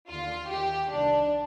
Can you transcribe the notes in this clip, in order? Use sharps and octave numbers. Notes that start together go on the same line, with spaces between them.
D#2 D3 F4
D#2 D#3 G4
C2 C3 D#3 D4